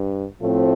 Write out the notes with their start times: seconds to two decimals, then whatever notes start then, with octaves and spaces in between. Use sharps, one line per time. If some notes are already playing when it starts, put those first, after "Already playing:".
Already playing: G2
0.41 A2 F3 A3 C4